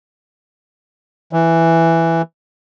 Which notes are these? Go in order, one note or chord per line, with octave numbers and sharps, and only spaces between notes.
E3